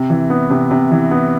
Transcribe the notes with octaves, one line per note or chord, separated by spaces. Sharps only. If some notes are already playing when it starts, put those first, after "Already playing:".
Already playing: C3
E3
B3
C3
C3
E3
B3